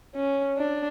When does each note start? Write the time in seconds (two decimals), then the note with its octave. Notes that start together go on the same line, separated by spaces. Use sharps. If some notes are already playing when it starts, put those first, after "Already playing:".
0.15 C#4
0.58 D4